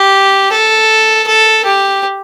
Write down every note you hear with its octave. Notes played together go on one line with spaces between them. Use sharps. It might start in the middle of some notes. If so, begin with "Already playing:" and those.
Already playing: G4
A4
A4
G4